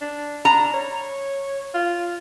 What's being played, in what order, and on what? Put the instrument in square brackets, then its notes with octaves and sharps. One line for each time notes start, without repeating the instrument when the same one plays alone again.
[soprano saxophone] D4
[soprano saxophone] D4 [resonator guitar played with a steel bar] A#5
[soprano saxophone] C#5
F4